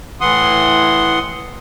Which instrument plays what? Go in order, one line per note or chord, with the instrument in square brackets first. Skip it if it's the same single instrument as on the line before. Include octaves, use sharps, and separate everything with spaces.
[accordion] A2 E3 F#5 C6 D#6